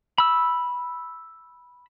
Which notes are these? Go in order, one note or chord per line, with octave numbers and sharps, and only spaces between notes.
B5 E6